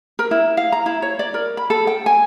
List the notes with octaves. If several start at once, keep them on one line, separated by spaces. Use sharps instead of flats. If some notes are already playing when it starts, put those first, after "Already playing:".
A#4
E4
F5
A#5
E4
C#5
D5
A#4
B5
A4
G5
G#5